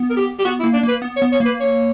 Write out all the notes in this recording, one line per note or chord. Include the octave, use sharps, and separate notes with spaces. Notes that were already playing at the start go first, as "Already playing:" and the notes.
Already playing: B3
A#4
G4
G4
B3 F#4
E4
A#3
D4
A#3 B4
B3
C#5
B3
C#5
A#3
B4
C#5